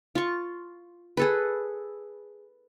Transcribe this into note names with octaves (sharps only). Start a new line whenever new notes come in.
F4 C#6
G#4 A4 B4